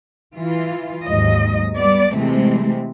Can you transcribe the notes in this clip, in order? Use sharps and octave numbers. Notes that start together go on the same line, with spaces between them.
E3 F4
D#2 G#2 F#3 D#5
G3 B3 D5
C3 E3 G#3 A3 C4